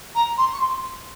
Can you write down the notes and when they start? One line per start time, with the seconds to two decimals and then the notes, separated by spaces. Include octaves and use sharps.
0.15 A#5
0.37 C6
0.53 C#6
0.60 C6